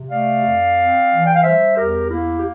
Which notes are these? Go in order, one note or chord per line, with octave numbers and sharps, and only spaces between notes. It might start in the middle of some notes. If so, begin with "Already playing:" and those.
Already playing: C3
A3 D5 F5
F2
C4
E3
G5
F5
G3 C5 E5
E2 G4 A#4
A#3 E4
G4